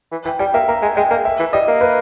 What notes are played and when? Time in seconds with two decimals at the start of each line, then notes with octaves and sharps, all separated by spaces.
0.11 E3
0.25 E3 G5
0.39 G3 G5
0.54 A#3 E5
0.68 A#3 A#5
0.82 G#3 G#5
0.96 G#3 G5
1.10 A#3 G5
1.25 E5
1.39 E3
1.53 G3 D#5
1.68 A#3
1.81 B4